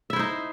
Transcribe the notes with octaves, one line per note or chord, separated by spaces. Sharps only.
D#4 E4 C5 E5